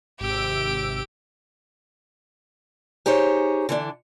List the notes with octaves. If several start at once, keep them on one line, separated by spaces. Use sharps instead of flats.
G#1 C3 G4 E6 D7
D#4 G4 G#4 C5 C#5
D3 E3 D4